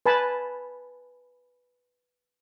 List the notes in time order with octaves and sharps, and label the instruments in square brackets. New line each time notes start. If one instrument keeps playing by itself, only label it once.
[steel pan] B4 G#5 A5 B5